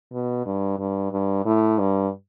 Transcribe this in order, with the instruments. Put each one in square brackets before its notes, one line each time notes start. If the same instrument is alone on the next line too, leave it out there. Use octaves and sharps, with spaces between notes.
[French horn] B2
G2
G2
G2
A2
G2